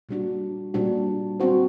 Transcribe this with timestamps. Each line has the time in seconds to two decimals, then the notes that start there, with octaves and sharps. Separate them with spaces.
0.09 A#2 G3 D4 F#4
0.74 A#2 G3 D4 F#4
1.40 G3 C4 F#4 C5